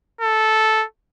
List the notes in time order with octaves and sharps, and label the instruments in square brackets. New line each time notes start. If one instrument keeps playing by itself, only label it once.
[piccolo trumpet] A4